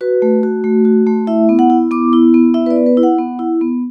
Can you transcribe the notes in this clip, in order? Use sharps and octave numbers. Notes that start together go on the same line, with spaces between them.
F#4 B4
A3
F#4
A3
F#4
A3
E4 E5
B3
F#5
E4
B3 D6
E4
B3
E4 E5
B4
D5
B3
B4
E4
F#5
B3
E4
B3